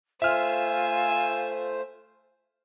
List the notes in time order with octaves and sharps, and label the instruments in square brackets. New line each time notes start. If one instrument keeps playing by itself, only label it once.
[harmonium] A3 C5 [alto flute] F4 [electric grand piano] E5 F6 [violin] G#5 E6